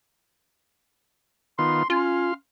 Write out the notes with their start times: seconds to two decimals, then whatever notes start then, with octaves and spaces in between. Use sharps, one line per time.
1.59 D#3 B3 F4 C6
1.90 C#4 F4 F5 C6